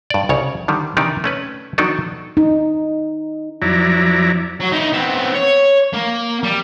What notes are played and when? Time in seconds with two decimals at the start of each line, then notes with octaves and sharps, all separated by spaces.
0.10 G2 D5
0.29 C2 C#3 C#5
0.68 D3 D#3 G3
0.97 C3 D#3 E3 D4 D#4 G4
1.24 A3 C#4 B4
1.78 D#3 F#3 B3 D4 D#4 A4
2.37 D#4
3.62 F2 F#3 E4 D5 A#5
4.60 F#3
4.72 D#4 E4
4.93 B3 C4
5.35 C#5
5.93 A#3
6.43 G3